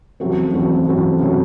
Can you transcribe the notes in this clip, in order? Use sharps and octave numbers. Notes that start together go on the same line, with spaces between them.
E2 C#3 F#3 A3 C4
E2 C#3 F#3 A3 C4
E2 C#3 F#3 A3 C4
C#3 F#3 A3 C4